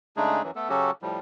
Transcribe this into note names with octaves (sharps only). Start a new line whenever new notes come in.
C#3 G#3 A3 D4 D#4 G#4
F#2 E3 F#3
A3 B3 A4
C#3 F#3 C#4 F#4 G4 A4
A2 F3 G3